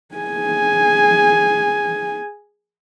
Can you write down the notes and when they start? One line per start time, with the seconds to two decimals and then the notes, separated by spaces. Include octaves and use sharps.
0.15 G#4 G#5